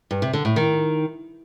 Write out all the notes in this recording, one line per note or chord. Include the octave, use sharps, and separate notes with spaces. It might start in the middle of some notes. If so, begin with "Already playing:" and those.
G2
C3
D3
A2
D#3